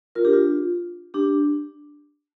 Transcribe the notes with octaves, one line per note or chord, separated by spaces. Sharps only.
F4 A#4
D4 G4
F4
D4 G4